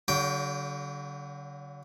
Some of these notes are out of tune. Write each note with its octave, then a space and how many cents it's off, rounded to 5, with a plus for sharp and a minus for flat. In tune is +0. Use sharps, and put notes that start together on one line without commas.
D3 -35 F#3 +25 G5 +0